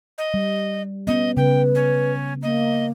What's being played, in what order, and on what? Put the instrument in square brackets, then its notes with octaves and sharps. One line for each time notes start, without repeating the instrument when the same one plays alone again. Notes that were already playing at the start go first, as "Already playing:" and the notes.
[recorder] D#5
[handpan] G3
[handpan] B3 C#4 [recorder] D#5
[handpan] C#3 [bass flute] B4 [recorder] G5
[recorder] C#4
[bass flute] A#3 [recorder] D#5